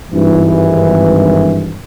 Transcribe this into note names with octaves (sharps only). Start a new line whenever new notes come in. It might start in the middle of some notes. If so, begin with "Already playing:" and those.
G#1 G2 E3